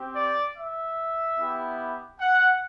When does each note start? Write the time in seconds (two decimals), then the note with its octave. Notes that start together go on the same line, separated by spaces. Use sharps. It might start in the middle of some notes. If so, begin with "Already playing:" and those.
Already playing: C4 G4
0.15 D5
0.57 E5
1.38 B3 E4 G4
2.20 F#5